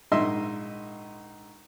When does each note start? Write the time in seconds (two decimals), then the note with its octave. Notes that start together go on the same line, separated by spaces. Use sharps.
0.12 A#1 G#2 D#5 E5 C6 E6